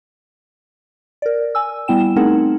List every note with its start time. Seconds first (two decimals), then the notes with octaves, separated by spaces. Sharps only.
1.22 A#4 D5
1.55 G#5 E6
1.88 G3 B3 E4 G5 E7
2.16 A3 C4 D#4 G#4 A#4 F#5